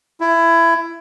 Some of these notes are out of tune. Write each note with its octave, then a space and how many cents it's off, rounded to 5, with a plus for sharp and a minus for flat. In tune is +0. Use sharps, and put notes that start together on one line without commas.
E4 +20